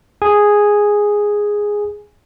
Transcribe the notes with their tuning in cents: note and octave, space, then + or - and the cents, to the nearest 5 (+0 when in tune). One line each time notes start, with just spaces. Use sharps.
G#4 -5 G#5 -5